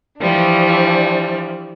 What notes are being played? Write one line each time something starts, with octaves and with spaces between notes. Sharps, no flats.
E3 F3 G3 D4